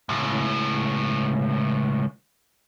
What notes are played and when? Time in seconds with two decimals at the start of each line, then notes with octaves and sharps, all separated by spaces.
0.09 C#2 A2